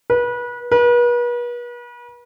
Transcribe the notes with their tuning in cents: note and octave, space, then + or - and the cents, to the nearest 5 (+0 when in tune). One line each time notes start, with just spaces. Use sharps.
B4 -30
B4 -40